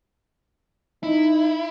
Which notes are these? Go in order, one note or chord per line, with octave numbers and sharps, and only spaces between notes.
D#4 E4